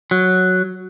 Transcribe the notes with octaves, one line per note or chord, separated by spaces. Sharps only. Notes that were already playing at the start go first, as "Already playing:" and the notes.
F#3